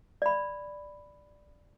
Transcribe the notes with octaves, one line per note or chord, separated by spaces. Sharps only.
D5 B5